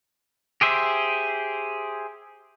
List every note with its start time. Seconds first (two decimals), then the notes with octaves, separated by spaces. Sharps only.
0.61 G4 G#4 C5 E5